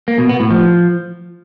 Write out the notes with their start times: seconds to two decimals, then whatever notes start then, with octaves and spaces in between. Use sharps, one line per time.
0.08 A#3
0.18 B2
0.29 B3
0.40 A2
0.51 F3